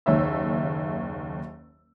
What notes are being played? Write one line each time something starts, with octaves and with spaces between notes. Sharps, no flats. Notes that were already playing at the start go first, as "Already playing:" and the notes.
F#1 D#2 C#5 E5 E6